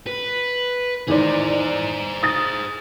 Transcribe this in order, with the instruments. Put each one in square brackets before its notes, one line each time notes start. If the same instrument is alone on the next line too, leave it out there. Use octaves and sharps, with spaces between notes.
[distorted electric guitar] B4
[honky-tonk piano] E2 D#3 D5 [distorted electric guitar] G#4 C5
[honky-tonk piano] D#6 A6